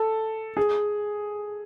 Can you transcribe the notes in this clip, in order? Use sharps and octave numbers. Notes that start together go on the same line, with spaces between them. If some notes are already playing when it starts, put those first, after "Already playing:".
Already playing: A4
G#4